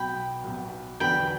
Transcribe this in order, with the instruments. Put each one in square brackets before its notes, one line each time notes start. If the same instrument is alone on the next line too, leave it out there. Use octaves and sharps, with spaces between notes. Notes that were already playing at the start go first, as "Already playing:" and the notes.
Already playing: [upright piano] B1 B2 F#3 [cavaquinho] G5 B5
[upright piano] B1 B2 F#3
[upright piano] E2 D3 F#3 B3 D4 [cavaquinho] G5 B5